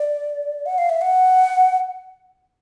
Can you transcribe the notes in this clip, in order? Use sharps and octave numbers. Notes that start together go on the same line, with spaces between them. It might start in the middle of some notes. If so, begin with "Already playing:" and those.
Already playing: D5
F#5
F5
E5
F#5